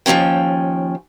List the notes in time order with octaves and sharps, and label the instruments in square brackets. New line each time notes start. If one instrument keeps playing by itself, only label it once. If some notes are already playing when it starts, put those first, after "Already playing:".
[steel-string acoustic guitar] D#2 F3 C4 C#4 G5